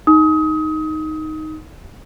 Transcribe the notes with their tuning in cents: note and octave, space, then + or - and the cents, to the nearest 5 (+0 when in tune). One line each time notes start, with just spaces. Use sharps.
D#4 +0 D#6 +30